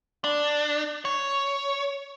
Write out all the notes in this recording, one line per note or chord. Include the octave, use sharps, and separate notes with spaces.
D4
C#5